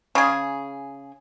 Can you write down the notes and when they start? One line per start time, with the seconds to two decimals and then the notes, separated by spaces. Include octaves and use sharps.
0.15 C#3 G#4